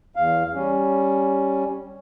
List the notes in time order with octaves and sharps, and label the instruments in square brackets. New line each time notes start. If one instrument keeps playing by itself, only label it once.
[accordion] E2 F5
G3 C#4